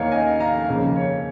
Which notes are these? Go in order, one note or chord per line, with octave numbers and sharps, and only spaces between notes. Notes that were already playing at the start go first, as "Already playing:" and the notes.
Already playing: D#2 D#3 A#3 D#4 C#5 F5
D#5 G#5
F5 A#5
F2 C#3 A#3 C#4
C#5